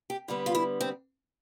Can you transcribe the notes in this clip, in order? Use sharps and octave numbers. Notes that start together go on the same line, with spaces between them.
G4
D3 G3 B3
F4
E4
C4